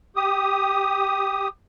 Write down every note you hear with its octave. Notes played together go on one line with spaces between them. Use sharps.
G4 D#6